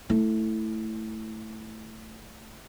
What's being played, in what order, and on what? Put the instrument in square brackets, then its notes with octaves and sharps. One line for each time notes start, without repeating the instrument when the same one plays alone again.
[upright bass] A3 E4